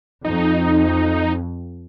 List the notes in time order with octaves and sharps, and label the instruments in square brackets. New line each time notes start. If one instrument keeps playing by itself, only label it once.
[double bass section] F2 [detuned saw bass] D#4